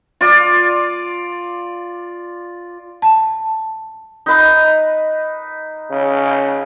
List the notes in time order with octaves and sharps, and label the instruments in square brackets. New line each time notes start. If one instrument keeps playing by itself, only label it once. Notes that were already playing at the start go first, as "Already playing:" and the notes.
[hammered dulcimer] F4 D5
[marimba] A5
[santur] D#4 B4
[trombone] C#3